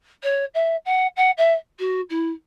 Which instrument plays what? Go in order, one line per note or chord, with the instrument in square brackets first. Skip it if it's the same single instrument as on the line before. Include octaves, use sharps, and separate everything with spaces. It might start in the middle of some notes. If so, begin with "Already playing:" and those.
[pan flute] C#5
E5
F#5
F#5
E5
F#4
E4